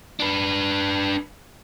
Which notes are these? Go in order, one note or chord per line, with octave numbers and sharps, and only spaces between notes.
D4 B4